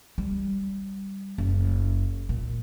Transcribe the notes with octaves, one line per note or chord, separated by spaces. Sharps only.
G3
F#1
A#2